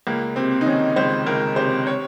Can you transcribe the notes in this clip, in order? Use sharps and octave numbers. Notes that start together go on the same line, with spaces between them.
C#2 A#3
C3 C4
D#4
D#3 C#4
C#2 C5
C#2 A#4
C3 C5
C#5